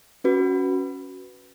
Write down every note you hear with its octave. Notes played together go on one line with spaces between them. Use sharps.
C#4 F#4 B4